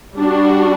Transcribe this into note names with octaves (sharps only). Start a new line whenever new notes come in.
G3 D4 F#4